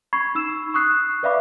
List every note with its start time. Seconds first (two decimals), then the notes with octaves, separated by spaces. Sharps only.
0.13 B5 C#6 G#6 C7
0.35 D#4 E6 E7
0.74 C#6 D#6 F#6 C7
1.23 B4 D5 E5 F5 B5 D6